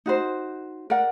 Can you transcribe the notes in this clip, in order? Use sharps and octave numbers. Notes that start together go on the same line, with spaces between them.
D#4 F#4 C5
A#4 D5 F#5